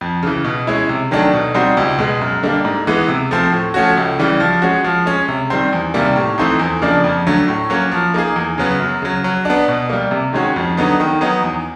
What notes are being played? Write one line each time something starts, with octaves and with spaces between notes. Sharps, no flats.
F2
C#3 E3
B2
G#3 C#4 E4
C3
D#3 F#3 A3 D4
B2
G3 C4 D#4 F#4
C#2
B2 G#3
F#2
D3 G3 A#3 D4
G#2
E3 G#3 B3
C3
F3 A3 C4
A2
F3 A3 C#4 F#4
C#2
C#3 E3 G3
F3
G#3 C#4 F#4
F3
G#3 C#4
C3
D#3 G3 C4
E2
C3 D#3 G3 A#3
A2
E3 A3 C4 D#4
E2
C#3 F3 A#3 D4
F2
D3 F#3 A3
A2
F#3 A#3 C#4
F3
A#3 D#4 G#4
E2
C#3 F#3 B3
F#2
C#3 F#3
F#3
B3 D4
B2
G3 A#3
C3
D#3 G#3 C#4 F#4
F2
D3 F#3 B3 D#4
D#3
F#3 B3 D#4
E2